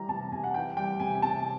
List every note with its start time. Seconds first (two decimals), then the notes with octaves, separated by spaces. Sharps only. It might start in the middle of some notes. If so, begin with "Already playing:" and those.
Already playing: E3 G3 A#5
0.09 C3 A5
0.32 C3 G#5
0.44 F#5
0.54 E3 G5
0.77 G3 G5
1.00 C3 G#5
1.15 G#5
1.22 C3 A5